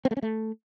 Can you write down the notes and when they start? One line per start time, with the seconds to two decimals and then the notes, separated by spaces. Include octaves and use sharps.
0.05 C4
0.11 A3
0.17 C#4
0.22 A3